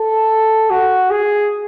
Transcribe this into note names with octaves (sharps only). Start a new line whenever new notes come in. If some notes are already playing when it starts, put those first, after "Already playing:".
Already playing: A4
F#4
G#4